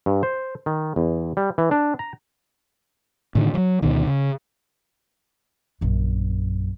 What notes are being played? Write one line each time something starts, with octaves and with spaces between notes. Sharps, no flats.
G2
C5
D#3
E2
G3
E3
D4
A#5
A2 D3 D#3
E3 F#3
D2 B2 D#3
C#3
A#1 F#2